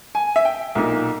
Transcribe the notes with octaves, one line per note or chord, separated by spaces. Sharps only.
G#5
E5
G5
B1 A#2 A#3 D#4